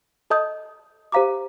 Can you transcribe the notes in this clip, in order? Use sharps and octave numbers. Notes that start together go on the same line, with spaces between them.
A4 D#5 A5 D#6 G6
G4 C5 F5 A#5 D6